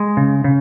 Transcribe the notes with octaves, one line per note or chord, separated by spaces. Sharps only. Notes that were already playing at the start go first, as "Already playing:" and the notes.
Already playing: G#3
C#3
C#3